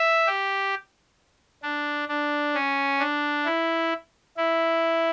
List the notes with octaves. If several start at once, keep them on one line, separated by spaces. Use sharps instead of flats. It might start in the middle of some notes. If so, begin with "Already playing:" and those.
Already playing: E5
G4
D4
D4
C#4
D4
E4
E4